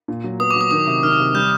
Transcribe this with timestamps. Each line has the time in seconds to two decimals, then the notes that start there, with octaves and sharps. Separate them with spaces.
0.08 A#2
0.24 F#3
0.40 B3 D#6
0.51 D6
0.56 F#3 D#6
0.71 D#3 D#6
0.87 C3
1.02 D#3 F6
1.19 C3
1.34 G3 G6